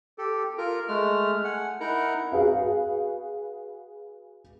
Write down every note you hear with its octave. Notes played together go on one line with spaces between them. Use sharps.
G4 A4
F4 A#4
G#3 A3 F6
F#5 G#5
D#4 E4 A#4 F#5
F#4 G#4 B4 F5